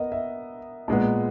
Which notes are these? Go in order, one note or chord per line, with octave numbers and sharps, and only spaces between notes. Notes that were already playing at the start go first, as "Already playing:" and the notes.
Already playing: B3 A#4 D#5
E5
A#2 G#3 B3